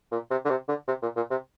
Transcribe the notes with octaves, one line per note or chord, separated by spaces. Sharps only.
A#2
C3
D3
C3
D3
C3
A#2
A#2
C3